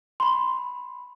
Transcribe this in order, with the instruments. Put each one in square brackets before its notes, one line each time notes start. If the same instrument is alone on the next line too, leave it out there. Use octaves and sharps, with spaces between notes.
[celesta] B5 C6